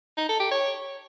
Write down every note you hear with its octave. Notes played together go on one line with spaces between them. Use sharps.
D#4
A4
G4
C#5